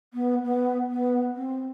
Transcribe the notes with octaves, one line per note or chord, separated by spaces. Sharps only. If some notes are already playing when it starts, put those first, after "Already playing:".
B3
B3
B3
C4